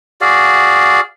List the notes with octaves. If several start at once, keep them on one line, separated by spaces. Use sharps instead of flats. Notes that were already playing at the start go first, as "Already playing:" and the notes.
F#4 G#4 D5 F5